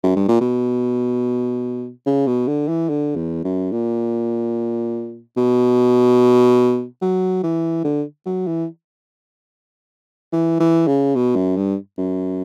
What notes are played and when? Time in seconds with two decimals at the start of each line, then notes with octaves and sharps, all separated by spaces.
0.03 F#2
0.16 G2
0.28 A#2
0.41 B2
2.06 C#3
2.27 B2
2.48 D3
2.68 E3
2.89 D3
3.16 E2
3.44 F#2
3.72 A#2
5.37 B2
7.02 F#3
7.43 E3
7.84 D3
8.26 F#3
8.47 E3
10.32 E3
10.60 E3
10.87 C#3
11.15 B2
11.36 F#2
11.57 G2
11.98 F#2